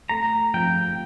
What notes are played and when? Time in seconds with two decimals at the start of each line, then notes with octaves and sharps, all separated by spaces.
0.09 A3 A#5
0.54 F3 G5